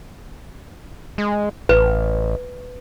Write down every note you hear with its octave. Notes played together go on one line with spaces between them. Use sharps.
G#3
A1 B4